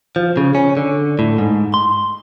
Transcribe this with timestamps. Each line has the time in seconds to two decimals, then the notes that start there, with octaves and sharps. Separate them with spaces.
0.16 F3
0.37 C#3
0.55 C#4
0.77 D3
1.19 A2
1.38 G#2
1.74 C6